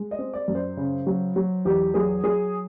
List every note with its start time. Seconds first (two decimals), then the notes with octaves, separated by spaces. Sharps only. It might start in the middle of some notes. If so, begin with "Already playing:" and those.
Already playing: G#3
0.11 D#5
0.19 C4
0.34 D5
0.48 F#2
0.55 C5
0.77 C#3
1.07 F#3
1.36 F#3
1.65 E2 G4
1.94 F#3 G#4
2.24 F#3 G#4